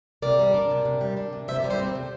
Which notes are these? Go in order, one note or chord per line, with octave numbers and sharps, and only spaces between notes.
C3 A#4 D5
G3
D4
C3
C3
G3
D4
C3
C3 C5 E5
A#4 D5
G3
A4 C5
C4
C3